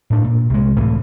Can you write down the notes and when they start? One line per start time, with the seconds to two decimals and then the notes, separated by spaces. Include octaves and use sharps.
0.10 A2 D4
0.24 A#2
0.50 C2 G#3
0.76 C#2 A2 C#3 E3